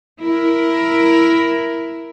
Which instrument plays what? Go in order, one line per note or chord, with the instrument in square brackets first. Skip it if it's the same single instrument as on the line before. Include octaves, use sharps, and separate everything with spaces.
[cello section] E4 A#4